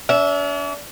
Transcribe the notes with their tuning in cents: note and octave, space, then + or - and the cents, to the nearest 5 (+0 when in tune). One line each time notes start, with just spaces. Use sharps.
D4 -45 E5 -5